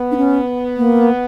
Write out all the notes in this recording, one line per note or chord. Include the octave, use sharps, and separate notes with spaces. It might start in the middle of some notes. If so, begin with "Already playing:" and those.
Already playing: B3
D4
C#4
A#3